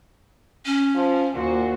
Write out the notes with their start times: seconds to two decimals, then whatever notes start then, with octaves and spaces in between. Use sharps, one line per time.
0.65 C#4
0.95 F3
1.34 D#2 A#2 F#4 C5